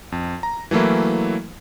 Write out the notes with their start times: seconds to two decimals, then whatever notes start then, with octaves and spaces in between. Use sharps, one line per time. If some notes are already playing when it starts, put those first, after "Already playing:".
0.12 F2
0.43 A#5
0.71 E3 F#3 A3 A#3 E4